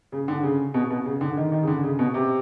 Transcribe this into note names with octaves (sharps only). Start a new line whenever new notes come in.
C#3
D3
C#3
B2
B2
C#3
D3
D#3
D#3
C#3
D3
C#3
B2
C3